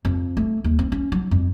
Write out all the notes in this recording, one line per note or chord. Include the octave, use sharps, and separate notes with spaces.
F2
A3
D#2
C4
C#4
F#3
F2